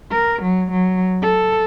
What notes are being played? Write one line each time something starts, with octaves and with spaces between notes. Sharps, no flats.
A#4
F#3
F#3
A4